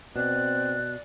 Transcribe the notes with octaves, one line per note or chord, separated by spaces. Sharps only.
B2 C4 D5 F#6